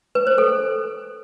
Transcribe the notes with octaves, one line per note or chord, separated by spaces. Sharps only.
B4
C5
A4